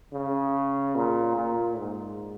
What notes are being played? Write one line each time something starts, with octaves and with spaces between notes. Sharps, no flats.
C#3
A#2
A#2
G#2